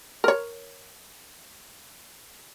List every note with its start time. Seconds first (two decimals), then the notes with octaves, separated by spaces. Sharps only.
0.24 A#4 C#5